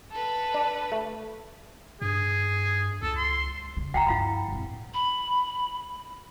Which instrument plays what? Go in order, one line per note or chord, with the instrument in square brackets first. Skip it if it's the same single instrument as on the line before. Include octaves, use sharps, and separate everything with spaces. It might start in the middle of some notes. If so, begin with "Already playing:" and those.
[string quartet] A4 B4
[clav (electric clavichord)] D4
A3
[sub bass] G2 [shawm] G#4
[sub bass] C#2 [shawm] A4
[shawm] C6
[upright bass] E2 C#3
[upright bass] D2 [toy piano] F#5 G5 A#5
[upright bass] G2 F3 [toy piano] E4 F5 B5
[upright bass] F2 A2
[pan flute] B5